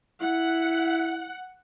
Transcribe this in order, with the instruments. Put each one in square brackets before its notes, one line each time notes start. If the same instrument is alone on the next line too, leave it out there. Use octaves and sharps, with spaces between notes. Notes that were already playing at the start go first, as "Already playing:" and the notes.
[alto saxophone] E4 [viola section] F#5